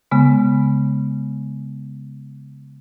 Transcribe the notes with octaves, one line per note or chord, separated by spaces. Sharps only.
C#3 G#3 B3